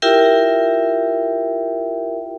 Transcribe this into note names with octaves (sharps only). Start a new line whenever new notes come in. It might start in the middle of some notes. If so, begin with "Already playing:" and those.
E4 F4 G4 A#4 E5 G5